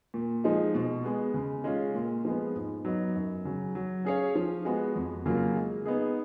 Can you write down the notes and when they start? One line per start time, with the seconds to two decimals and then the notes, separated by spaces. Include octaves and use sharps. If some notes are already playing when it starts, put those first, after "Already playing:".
0.14 A#2
0.44 F3 G#3 D#4
0.74 B2
1.04 G#3 B3
1.34 C#3
1.64 G#3 C#4 F4
1.95 A#2
2.25 F3 G#3 B3
2.55 G#2
2.85 F#3 B3 D#4
3.15 F#2
3.45 C#3 F#3
3.75 F#3
4.05 C#4 G#4 C#5 F5
4.35 F3
4.65 G#3 B3 F#4
4.95 F2
5.26 C#3 F#3 A#3 F4
5.56 G#3
5.86 B3 D#4 G#4